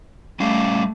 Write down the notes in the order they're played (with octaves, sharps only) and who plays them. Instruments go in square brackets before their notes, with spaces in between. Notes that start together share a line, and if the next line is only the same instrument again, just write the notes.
[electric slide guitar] G3 C#4 F5 [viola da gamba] A3